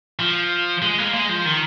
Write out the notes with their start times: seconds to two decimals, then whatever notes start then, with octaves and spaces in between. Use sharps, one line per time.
0.19 F3
0.82 G#3
0.98 A#3
1.14 G#3
1.29 F3
1.45 D#3